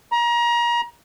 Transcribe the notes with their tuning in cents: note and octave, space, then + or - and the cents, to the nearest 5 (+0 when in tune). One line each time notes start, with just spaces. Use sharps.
A#5 +30